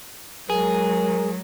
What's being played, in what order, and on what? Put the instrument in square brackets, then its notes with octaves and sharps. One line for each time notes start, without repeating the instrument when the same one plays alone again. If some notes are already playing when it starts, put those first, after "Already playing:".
[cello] F#3 G#3 [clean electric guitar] G#4 [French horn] A#4